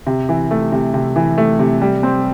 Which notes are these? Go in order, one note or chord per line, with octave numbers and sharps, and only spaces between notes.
C3
E3
A3
C3
C3
E3
A3
C3
G3
C4